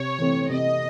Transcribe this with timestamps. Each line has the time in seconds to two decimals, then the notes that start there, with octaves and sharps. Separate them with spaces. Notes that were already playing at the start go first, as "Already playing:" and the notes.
Already playing: C3 C#5
0.19 E3 A3 C4
0.49 C3 D#5